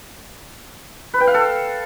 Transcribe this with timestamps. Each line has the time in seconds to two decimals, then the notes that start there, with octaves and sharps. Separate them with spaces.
1.14 B4
1.20 G5
1.27 F5
1.34 A4